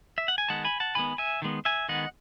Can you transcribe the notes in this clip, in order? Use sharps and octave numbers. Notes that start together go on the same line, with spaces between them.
E5
F#5
G#5
D#3 G#3 B3 F#5 A5
G#5 B5
F#5 A5
D#3 G#3 B3 G#5 B5
E5 G#5
D#3 G#3 B3
E5 G#5
D#3 G#3 B3 D#5 F#5